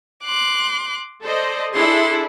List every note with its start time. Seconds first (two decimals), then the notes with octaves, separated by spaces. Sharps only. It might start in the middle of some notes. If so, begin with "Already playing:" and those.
0.24 C6 D6 F#6
1.24 A4 C5 D5 D#5
1.74 D4 E4 G#4 A4 C6